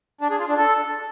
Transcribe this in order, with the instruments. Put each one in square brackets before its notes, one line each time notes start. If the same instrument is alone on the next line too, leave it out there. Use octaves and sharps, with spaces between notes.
[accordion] D4
G#4
F4
D4
A4